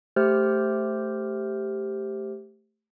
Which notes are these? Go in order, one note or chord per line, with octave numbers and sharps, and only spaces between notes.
A3 G4 C5 F6